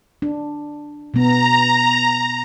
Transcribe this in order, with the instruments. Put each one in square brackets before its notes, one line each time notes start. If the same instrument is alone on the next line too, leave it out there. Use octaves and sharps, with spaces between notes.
[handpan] D4
[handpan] B2 B3 [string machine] A#5